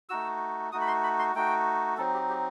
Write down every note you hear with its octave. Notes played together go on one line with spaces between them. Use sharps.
A3 D#4 F#4 E6
A3 D#4 F#4 D#6
B5
C6
B5
C6
A3 D#4 F#4 G5
F#3 C4 D#4 A4
G4
G4